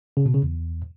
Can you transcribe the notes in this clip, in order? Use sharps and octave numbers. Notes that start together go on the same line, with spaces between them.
C#3
B2
C#3
E2